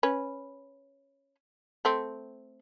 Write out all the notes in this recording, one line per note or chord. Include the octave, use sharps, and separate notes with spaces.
C#4 B4
A3 C4